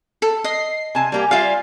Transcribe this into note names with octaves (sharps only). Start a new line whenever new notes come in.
A4
D#5 C7
C3 G#5 A5
G3 A#3 G4
G3 F4 E5 F5